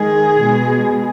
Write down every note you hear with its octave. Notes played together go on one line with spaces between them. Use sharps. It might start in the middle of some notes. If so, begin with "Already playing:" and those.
Already playing: D#3 G#3 G#4
B2 G#3